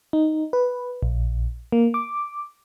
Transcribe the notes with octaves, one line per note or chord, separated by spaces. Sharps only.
D#4
B4
A#1
A#3
D6